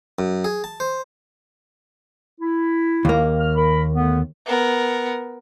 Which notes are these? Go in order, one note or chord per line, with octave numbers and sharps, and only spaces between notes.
F#2
G#4
A5
C5
E4
D#2 A#3
F6
A#4 B5
D3 A3 B3
B3 A#4